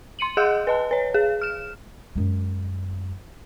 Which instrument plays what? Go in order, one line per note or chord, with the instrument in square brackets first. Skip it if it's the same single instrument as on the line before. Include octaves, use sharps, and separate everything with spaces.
[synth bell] C6 C#7 D#7 F#7
G#4 D#5 F#5 E6 F#6 G6
B4 D#5 A5
B4 C#5
G#4
F6 E7
[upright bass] F#2 G#3